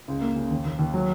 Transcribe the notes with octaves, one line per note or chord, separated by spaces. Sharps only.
C#2
A#3
C#3
D#2
D#2
D#2
F#3